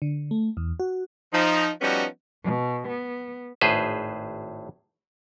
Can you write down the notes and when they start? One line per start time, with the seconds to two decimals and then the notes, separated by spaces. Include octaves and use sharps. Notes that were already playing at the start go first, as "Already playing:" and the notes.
0.02 D3
0.31 A3
0.57 E2
0.80 F#4
1.33 F3 D#4
1.82 F3 G3 B3 C#4 D#4 F#4
2.43 B2
2.88 B3
3.61 G#1 A2 G#4 B4 C5